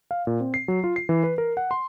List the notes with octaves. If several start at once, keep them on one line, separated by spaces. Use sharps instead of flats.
F5
A#2
C4
C7
F#3
F4
C7
E3
B4
A#4
F#5
C6